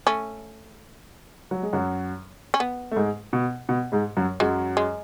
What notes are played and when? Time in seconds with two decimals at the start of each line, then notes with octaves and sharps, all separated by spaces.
0.07 A3 C#4
1.51 F#3
1.63 G#3
1.73 F#2 F#3
2.54 C#4
2.60 B3
2.91 A3
2.96 G#2 G#3
3.33 B2
3.69 B2
3.92 G#2 G#3
4.17 F#2 F#3
4.40 F#2 F#3 G#3
4.77 G#3